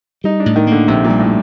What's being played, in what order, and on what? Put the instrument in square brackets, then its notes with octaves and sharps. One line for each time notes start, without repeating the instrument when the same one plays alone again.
[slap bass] G3 [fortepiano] D#4
[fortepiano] D4
[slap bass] A2
[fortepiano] D#3
[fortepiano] D3 [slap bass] A#3
[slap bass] A#1 [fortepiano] C3
[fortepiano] A#2
[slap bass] G3
[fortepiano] A2